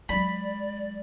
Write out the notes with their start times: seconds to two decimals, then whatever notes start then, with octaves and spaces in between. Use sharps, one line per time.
0.09 F#3 G#3 D5 B5